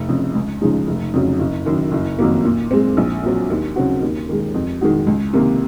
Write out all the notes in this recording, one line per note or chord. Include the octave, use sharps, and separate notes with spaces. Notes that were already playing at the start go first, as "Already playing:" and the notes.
Already playing: F1
F2 C#3
C#2
C#3 F3 G#3 D#4
F1
F2 C#3 F#3
F#1
F#2 D#3
F#1
F2 D#3 F#3 A#3
A#2
G#3 C4
A#1
A#2 F#3 C4
D#2
C#3 F#3 C4 F#4
D#2
D#3 G#3
F2
D#3 G#3 D#4 F#4
C#2
C3 D#3 A#3